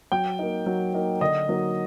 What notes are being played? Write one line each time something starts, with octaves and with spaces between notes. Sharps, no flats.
F#3 G5
A#3 D#4
F#3
A#3 D#4
D3 D#5
F#3 A#3 D#4